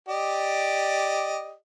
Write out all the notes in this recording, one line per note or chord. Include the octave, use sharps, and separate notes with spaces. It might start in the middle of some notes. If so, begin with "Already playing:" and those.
G4 D5 D#5